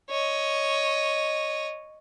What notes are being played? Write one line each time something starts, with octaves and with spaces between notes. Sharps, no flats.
C#5 D#5